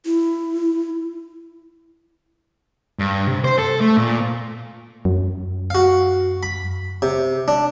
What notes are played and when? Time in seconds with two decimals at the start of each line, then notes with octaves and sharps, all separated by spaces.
0.06 E4
2.99 G2
3.28 C3
3.45 C5
3.59 A4
3.81 A3
3.97 A#2
5.05 F#2
5.70 F#4 F5
6.43 B5
7.02 C3
7.48 D4